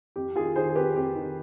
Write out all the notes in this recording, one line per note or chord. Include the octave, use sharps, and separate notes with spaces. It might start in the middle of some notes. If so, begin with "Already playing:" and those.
F2 G4
D#3 F4 G#4
D#3 G#4 C5
G#4
F2 G4 B4
F2 G4
D#3